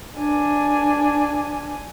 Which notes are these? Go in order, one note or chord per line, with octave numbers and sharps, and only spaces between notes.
D4 G#5